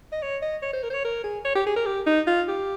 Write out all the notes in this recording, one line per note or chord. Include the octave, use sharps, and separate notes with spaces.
D#5
C#5
D#5
C#5
C5
A#4
C5
C#5
A#4
G#4
C#5
G4
G#4
A#4
G4
D#4
F4
G4